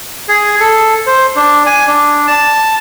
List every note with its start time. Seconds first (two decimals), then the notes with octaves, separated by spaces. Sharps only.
0.28 G#4
0.60 A4
1.07 C5
1.36 D4
1.66 G#5
1.88 D4
2.27 A5